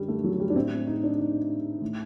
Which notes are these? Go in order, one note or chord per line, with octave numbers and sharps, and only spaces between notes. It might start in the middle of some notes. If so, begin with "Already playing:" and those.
Already playing: F#2 D3 G3
A3
F#3
G3
D4
A2 C4
D#4
D4
D#4
A2